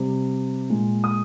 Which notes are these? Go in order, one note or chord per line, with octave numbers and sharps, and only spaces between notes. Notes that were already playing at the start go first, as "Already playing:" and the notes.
Already playing: C3 G3
A#2 G#3
D#6